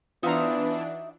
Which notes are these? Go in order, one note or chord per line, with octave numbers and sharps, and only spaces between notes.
E3 B3 D4 D#4 F4 F#4 E5 A#5